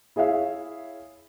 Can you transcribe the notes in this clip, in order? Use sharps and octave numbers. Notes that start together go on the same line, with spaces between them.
E4 G#4 C#5 E5 F5